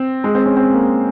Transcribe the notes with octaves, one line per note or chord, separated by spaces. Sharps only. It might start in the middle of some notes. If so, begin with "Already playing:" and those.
Already playing: C4
G#3
C4
C#4
C4
A#3